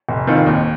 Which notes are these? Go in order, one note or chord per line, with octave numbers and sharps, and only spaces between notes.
F1
F2 D#3 C4 F4
D#2